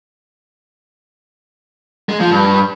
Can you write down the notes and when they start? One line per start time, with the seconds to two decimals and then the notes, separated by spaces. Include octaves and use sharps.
2.09 G#3
2.20 F3
2.31 G2